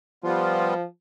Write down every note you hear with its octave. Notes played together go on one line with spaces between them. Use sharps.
F3 G3 B3 F4